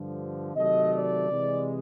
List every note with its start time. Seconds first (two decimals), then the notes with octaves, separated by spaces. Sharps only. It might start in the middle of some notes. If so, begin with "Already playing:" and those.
Already playing: G2 D3 F3
0.55 C3 D#3 F#3 A3 D#5
0.93 D5
1.31 C3 E3 G#3